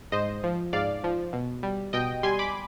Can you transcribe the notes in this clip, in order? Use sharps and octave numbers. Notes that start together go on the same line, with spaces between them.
G#2 C5 D#5
F3
G#2 D5 F5
F3
B2
G3
B2 D#5 G5
G3 G#5 C6
B5 D6